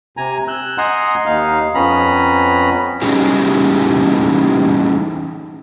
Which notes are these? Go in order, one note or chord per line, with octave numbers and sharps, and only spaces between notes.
C3 G#5 A#5
E6 F#6 G6
D#5 F#5 G#5 A#5 C6
D#2 D#4 F5
F2 B3 C#4 A#5 B5
E3 G3 C#4 D#4 G4 G#4